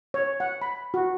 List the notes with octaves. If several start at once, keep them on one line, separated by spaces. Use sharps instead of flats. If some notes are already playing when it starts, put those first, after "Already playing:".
C#5
F#5
B5
F#4